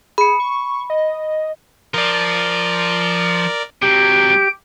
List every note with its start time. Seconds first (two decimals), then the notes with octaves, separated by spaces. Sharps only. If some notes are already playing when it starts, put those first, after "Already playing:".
0.18 G#4 B5 C#7
0.40 C#6
0.90 D#5
1.94 F3 A#4 D5
3.82 C3 F#3 G4 D7